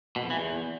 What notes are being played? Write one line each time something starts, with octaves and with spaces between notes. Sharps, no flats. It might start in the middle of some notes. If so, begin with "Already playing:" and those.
B2
F2
E3
E2